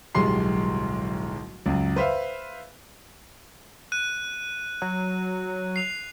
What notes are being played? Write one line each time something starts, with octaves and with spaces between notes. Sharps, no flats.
D1 B1 G3 G#3 C6 C7
C#2 F#2
B4 C5 E5 F5
F#6 D#7
F#3
C7 F7